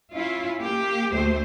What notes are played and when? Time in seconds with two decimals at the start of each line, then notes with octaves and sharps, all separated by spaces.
0.14 C#4 E4 F4
0.61 A#3 G4
1.12 D2 A3 C5